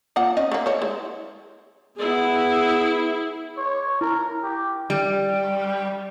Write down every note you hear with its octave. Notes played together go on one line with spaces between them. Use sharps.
A#3 F4 F#5
C#4 D#4 D#5
A3 A#3
C5 C#5
G#3 E4
B3 E4 G#4
C#5
E4 A#4
G4
G3